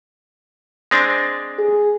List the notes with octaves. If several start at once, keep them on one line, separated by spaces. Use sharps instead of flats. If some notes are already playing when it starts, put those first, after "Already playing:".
G#3 C4 D4
G#4